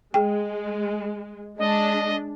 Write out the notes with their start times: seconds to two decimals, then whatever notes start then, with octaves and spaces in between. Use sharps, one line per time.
0.14 G#3 G#4 G5
1.58 G#3 D4 D#5